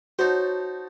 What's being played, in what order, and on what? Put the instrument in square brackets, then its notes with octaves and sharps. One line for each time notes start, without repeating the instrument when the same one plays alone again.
[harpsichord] D#4 C5 [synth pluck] F#4 C#5 A5